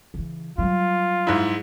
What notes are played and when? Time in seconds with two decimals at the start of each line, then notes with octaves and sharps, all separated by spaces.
0.14 C#3 E3
0.58 F#3 G3 F4
1.27 G#2 G#3 E4